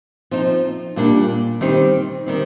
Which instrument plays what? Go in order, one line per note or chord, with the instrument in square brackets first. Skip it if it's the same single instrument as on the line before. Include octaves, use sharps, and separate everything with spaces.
[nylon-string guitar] F3 C4 D#4
A#2 G3 A#3 D4
D#3 G3 C4 D#4 G4
D#3 G3 C4